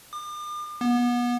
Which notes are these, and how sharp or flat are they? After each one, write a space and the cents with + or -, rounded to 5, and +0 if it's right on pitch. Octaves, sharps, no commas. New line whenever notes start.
D6 +45
B3 -30